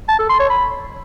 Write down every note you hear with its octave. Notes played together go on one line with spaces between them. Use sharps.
A5
A4
C6
C#5
B5